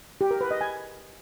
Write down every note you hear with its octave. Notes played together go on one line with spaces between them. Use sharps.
G4
A#4
B4
D#5
G#5